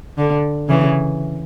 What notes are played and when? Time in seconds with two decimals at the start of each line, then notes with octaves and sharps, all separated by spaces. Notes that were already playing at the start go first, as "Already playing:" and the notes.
0.18 D3
0.69 C#3 E3